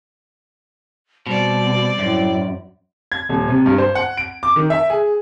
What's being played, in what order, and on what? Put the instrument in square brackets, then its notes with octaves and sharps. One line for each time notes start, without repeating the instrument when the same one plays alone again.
[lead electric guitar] B2 [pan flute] G3 [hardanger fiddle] C4 D5
[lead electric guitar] F#2 [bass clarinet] A2
[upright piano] G#6
D#1
C3
G2
C5
F#5
D7
D6
D#3
E5
G#4